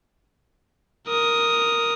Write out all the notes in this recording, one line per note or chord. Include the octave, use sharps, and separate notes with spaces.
A#4 D#6